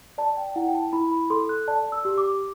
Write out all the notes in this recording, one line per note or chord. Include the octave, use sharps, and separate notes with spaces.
D5 A5
G5
E4 F#5
G5
A5
E4 B5
B5
A4 C6
F#6
D5 A5
E6
G4
D6